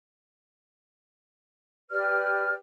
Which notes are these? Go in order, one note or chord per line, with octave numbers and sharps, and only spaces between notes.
G4 B4 D5 F6